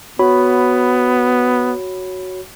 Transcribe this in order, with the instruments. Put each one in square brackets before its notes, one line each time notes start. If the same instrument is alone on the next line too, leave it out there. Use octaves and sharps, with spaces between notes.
[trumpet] B3 [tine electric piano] F#4 C#5 B5